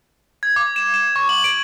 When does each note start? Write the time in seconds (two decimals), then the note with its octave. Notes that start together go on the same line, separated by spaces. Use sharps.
0.43 G#6
0.56 D6
0.76 E7
0.94 E7
1.16 C#6
1.29 F#7
1.44 D7